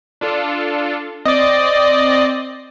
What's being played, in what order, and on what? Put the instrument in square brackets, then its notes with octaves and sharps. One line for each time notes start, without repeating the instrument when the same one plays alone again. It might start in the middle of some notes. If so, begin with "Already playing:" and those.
[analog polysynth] D4 F4 A4
[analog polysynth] C4 [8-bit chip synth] D5 D#5